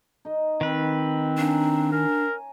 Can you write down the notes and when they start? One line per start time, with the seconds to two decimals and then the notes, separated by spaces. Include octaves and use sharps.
0.25 D#4 D#5
0.61 D#3 C4 B4
1.38 C#4 D4 F5 A#5
1.92 A#4 G#5